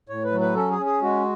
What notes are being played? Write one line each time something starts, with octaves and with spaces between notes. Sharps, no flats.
A2 C#5
B4
F#3
B4
C#4 A4
G#4
C#4
G#4
G#3 F#4